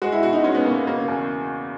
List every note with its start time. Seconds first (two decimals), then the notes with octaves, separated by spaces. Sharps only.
0.02 G#3 F#4
0.12 E4
0.23 B2 F#4
0.33 D#4
0.44 G#3 C#4
0.55 B3
0.65 B2 A#3
0.75 B3
0.86 C#3 A#3
1.08 E2